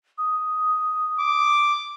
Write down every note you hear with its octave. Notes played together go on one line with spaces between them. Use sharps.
D#6
D6